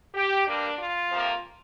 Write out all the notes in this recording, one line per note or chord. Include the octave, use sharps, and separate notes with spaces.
G4
G2 G3 A#3 D4
F4
F2 C3 F3 A#3